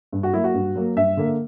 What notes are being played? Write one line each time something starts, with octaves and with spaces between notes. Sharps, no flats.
G2
F#4
F#3 A#3 E4
F#4
G2
F#3 A#3
G2 E5
D3 A#3